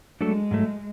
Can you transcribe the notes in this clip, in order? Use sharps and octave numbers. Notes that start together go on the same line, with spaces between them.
F#3 G#3 A3 D4 F#4 A4
G#2 F#3 A3